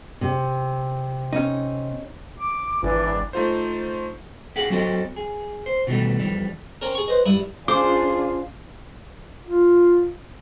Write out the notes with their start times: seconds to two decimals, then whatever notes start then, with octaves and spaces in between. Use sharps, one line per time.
0.21 C3
1.33 C#4 D#4
2.38 D6
2.83 G#1 E3 D4
3.33 A3 D#4 F4 C5
4.56 G4 G#4 F5 F#5
4.70 F#3 C4 F#4 A4 C#5 D#5
5.16 G#4
5.66 C5
5.87 B2 D#3 E3 F#3 G3 A3
6.19 F2 E3 G3
6.82 C4 C#4 A#4
6.95 G#4 C#6
7.08 B4 C5 D#5
7.26 G2 G3 E4 D#6
7.68 C#4 D4 F4 G#4 C5 F5 D6
9.47 F4